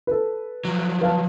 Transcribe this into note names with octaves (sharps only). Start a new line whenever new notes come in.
A4 B4
F3 F#3
B4 F5 A5